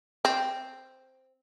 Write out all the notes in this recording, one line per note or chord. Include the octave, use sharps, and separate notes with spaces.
C4